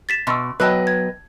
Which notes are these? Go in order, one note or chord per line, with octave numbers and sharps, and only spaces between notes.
A6 B6 E7
B2 C6 C#6 E6
F#3 B3 B4 D#5 G5 A5 E6 F#6
G#6